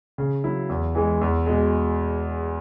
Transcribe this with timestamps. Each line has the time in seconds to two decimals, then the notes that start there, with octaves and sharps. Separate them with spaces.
0.18 C#3
0.44 F#3 E4
0.69 E2
0.95 E3 G#3
1.21 E2
1.46 B2 G#3